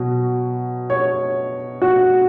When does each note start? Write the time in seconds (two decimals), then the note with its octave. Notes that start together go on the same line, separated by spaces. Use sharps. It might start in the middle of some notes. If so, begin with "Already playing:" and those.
Already playing: B2 F#3
0.90 C#5
1.82 F#4